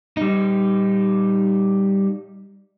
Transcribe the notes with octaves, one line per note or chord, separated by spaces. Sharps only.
G3 D#4